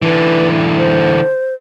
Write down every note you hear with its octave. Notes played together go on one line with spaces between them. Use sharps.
D3 E3 B4
C5